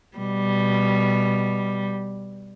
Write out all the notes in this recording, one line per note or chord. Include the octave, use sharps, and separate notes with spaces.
B2 G3